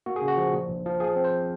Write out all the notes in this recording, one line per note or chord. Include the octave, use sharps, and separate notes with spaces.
A#3 F#4
G#4
C#3
F#4
F3
A#2
A#1
F3
F3 G#4
C4
C5